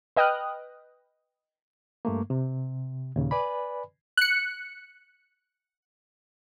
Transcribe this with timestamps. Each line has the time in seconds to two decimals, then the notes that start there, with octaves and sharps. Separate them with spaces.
0.17 B4 D#5 G5 D#6 F6 F#6
2.05 G2 A3 A#3
2.30 C3
3.16 D#2 A#2 C#3
3.31 B4 D5 G#5 B5
4.17 F#6 C#7